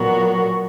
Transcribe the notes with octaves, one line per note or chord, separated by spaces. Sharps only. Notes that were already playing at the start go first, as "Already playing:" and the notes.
Already playing: A#2 F#3 B3 F#4 A#4